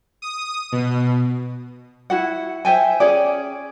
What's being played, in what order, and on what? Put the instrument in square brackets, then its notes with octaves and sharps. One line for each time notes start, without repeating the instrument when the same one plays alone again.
[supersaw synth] D#6
B2
[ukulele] E4 F#4 F#5
C5 E5 G5 G#5
C#4 G#4 D5